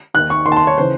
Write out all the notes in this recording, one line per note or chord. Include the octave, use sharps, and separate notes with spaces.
D#2 D#3 F#6
C#6
D#2 D#3 C6
A5
C6
C#5
C#3 E3 C5